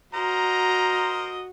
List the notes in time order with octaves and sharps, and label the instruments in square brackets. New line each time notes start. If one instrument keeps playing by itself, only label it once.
[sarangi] F#4 [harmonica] A#4 C5 D#5 [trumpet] A#5